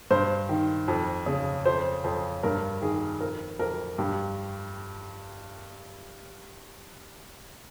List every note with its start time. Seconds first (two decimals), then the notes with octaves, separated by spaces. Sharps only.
0.11 G2 C5
0.49 D#3
0.88 F2
1.26 C#3
1.66 F2 C5
2.04 F2 C5
2.43 G2 A#4
2.82 D#3 G#4
3.21 F2 A#4
3.59 F2 A#4
3.98 G2 G4